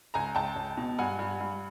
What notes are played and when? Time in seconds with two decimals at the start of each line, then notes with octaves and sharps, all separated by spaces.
0.14 C#2 G#5 A#5
0.35 C#2 G5 A5
0.56 C#2
0.77 B2
0.98 G2 F#5 G#5
1.19 G2
1.40 G2